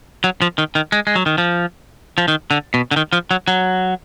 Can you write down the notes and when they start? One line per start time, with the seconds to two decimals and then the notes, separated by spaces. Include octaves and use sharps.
0.24 F#3
0.42 F3
0.58 D#3
0.75 D#3
0.92 G#3
1.07 G#3
1.15 F#3
1.26 D#3
1.38 F3
2.18 F3
2.28 D#3
2.51 D3
2.74 B2
2.91 D3
2.96 D#3
3.13 F3
3.31 F#3
3.48 F#3